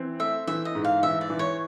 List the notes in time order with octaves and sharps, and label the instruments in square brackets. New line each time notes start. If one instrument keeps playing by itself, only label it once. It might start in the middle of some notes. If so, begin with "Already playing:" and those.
Already playing: [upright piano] E3 C4
[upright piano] A3 [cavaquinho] E5
[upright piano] E3 [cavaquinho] E5
[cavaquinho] D#5
[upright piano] G#2
[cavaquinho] F5
[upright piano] E3 [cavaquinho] E5
[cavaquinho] D5
[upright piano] E3
[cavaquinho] C#5